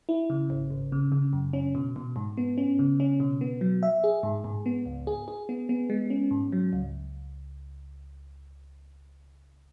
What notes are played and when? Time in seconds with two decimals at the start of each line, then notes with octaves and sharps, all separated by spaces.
0.09 E4
0.30 C#3
0.50 G#1
0.70 G#1
0.92 C#3
1.12 C#3
1.33 F#2
1.53 C#4
1.75 B2
1.96 B2
2.16 G#2
2.37 B3
2.58 C#4
2.79 C#3
3.00 C#4
3.20 B2
3.41 B3
3.61 F#3
3.83 E5
4.04 G#4
4.23 G#2
4.44 G#2
4.66 B3
4.86 C#2
5.07 G#4
5.28 G#4
5.49 B3
5.69 B3
5.90 G#3
6.10 C#4
6.31 G#2
6.52 F#3
6.73 C#2